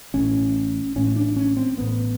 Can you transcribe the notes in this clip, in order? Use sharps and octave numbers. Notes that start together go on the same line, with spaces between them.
A1 A2 C#4
A1 A2 C#4
D4
C#4
C4
A1 A2 B3